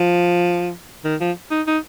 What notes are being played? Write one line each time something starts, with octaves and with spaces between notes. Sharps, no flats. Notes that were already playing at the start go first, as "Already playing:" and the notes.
Already playing: F3
D#3
F3
D#4
D#4